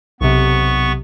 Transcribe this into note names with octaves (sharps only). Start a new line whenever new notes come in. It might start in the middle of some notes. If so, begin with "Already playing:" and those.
B1 C3 B3 C#6